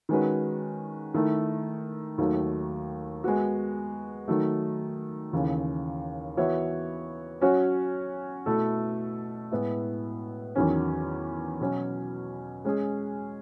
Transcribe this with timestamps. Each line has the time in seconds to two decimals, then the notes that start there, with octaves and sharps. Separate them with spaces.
0.09 D#3 G#3 C#4 F#4 B4
1.14 D#3 A3 E4
2.18 D#2 D#3 F#3 A3
3.24 G#3 B3 F#4
4.28 D#3 F#3 A3
5.33 D#2 C#3 E3
6.37 E3 B3 F#4 C#5 E5
7.41 F#3 C#4 F#4 C#5
8.46 B2 A3 E4 A4
9.52 A2 G#3 B3 E4
10.55 E2 D#3 F#3 C#4
11.61 B2 F#3 C#4
12.65 G#3 C#4 G#4